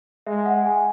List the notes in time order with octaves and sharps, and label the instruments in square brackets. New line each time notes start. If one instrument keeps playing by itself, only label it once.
[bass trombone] G#3 [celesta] E5
[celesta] F#5
G#5